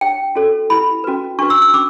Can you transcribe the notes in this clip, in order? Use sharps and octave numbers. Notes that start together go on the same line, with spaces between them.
D4 G4 C#5 G5
C#4 F#4 A4 C#5
E4 G4 B4 B5
C#4 F#4 B4
D4 F#4 B4 C#6
E6
E6
C#4 D6